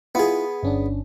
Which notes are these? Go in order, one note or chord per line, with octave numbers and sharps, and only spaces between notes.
B3 E4 F4 G#4
G1 C#4 D4